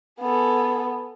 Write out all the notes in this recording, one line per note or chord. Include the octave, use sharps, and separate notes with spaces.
B3 G#4 A4